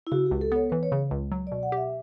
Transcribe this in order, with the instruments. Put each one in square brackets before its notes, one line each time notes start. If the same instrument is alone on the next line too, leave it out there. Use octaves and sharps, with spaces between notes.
[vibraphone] E4
[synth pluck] C#3 [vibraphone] F#4
[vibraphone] G4
[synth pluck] C#2
[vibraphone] A4
[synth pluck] B3 [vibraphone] C#5
[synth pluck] E3 [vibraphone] B4
[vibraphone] C#5
[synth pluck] C#3
C#2
F#3
[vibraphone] D5
[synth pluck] B2
[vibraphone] F#5
[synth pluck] G4 [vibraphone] E5